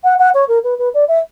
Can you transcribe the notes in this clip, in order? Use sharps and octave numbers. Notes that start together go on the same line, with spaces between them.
F#5
F#5
C#5
A#4
B4
B4
D5
E5